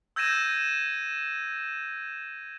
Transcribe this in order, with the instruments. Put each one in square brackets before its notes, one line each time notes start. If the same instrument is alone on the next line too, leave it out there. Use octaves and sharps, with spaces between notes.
[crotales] E6 G6 G#6 A#6 D#7 E7